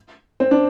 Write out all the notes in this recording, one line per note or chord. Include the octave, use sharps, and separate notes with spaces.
C4
D4